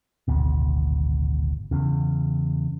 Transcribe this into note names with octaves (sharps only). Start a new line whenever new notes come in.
D1 G#1 D2 B2
E2 C#3